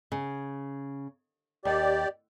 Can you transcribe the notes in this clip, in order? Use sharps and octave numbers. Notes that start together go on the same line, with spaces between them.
C#3
D#2 G4 D5